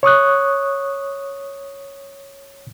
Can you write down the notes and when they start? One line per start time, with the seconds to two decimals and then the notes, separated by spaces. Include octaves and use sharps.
0.03 C#5 C#6 D#6 F#6